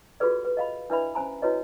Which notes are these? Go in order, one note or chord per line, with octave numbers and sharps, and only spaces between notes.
F4 F#4 G#4 A4 B4 D5
B4
D#5 F5 B5
D4 E4 B4 D5 E5 B5
C#4 C5 G#5 A#5 B5
E4 F#4 B4 C#5 D#5